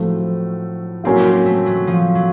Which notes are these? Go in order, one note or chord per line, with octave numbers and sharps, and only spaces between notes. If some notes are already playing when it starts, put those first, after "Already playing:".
Already playing: A2 F3 F#3 A3 C4
A2 F#3 A#3 C4 C#4
C4
A3
F#3
F3
F#3